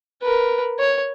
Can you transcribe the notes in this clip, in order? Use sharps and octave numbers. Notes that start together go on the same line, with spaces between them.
A#4 B4
C#5